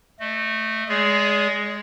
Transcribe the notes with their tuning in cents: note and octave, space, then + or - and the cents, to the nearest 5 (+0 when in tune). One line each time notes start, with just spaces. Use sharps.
A3 +0 D#5 -30
G#3 +0 G#4 +10 D5 -40